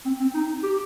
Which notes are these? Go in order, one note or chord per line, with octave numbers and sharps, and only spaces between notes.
C4
C4
D#4
G4